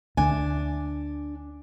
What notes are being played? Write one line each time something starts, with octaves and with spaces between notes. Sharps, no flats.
D2 D3 D4 G#5